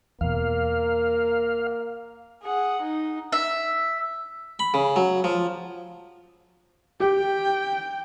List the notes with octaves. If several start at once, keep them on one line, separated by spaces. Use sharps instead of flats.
E2 B2 A#3 F5
G#4 F#5
D#4
E5
B5
C#3
F#3
F3
G4 G5